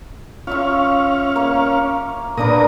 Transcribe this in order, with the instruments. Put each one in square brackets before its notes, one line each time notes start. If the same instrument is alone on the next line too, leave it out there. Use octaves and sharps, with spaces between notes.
[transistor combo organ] C#4 F5 [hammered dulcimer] F4 E5 C#6
[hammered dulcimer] A#3
[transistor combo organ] A#2 A#5 D#6 [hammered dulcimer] A#3 D4 B4